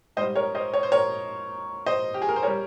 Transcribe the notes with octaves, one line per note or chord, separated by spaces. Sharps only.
G#2 G3 C5 D#5
A#4 C#5
C5 D#5
C#5
C5
A#4 C#5
C5 D#5
G4
G#4
A#4
C5
G3 A#4 C#5